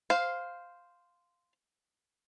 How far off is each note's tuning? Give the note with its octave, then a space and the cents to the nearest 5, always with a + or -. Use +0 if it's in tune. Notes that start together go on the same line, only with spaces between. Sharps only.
C5 -5 F5 +5